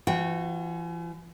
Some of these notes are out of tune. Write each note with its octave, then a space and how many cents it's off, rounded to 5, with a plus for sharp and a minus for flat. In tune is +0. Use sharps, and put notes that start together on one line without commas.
E3 +45 F#4 -15 G5 -10